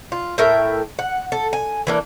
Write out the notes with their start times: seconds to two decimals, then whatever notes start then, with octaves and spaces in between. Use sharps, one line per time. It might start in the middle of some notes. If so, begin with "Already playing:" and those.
0.12 F4
0.38 A2 A#4 E5 G5
0.99 F#5
1.32 A4
1.53 G#5
1.87 E3 A#3 D4